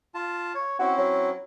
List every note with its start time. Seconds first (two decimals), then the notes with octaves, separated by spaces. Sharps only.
0.14 F4 A5
0.55 C#5
0.80 C4 C#4 E4 F#4
0.98 F#3